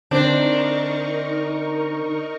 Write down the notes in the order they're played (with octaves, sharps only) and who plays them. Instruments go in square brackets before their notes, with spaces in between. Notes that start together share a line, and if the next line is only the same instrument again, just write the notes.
[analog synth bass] D3 [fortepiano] C4 [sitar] D4 C5 [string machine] D#4 A#4 C#6